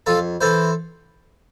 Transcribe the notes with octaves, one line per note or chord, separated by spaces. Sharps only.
F2 F4 A4
E3 A4 C5